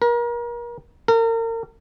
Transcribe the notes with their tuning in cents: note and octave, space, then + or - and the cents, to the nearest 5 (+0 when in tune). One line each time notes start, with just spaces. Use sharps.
A#4 +35
A#4 -35